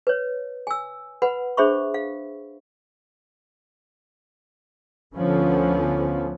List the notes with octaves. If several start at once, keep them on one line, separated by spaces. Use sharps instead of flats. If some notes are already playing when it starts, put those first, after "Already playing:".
B4 C#5
G#5 E6
B4 F#5 B5
D4 G#4 C5 E5 B5 C#6
F5
D2 D3 F3 B3 C#4